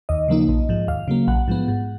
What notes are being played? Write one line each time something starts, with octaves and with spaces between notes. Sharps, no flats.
D#2 D#5
C#3 F3 A#3 D#4
A#1
G#2 F3
D#2 F5
C#3 F#3 A#3
A#1 F#5
G#2 F3 B3
G#2